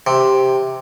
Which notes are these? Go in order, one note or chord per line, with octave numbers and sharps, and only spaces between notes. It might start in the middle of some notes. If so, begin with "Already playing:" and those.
C3